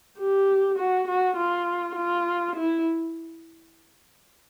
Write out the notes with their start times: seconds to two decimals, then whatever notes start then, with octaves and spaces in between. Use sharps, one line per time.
0.18 G4
0.78 F#4
1.08 F#4
1.37 F4
1.96 F4
2.56 E4